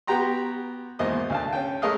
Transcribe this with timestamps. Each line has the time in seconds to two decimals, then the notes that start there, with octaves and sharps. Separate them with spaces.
0.07 B3 F#4 G4 G5 A#5 C6
0.99 G#1 E2 A#3 C5 D#5 D#6
1.30 D2 F5 A5
1.53 C#4 G5
1.82 G#3 A3 A#4 C#5 D#5 F5